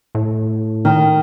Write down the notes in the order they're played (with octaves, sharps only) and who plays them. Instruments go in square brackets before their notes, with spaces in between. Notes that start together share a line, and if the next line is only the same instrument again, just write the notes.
[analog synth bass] A2
[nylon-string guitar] D#3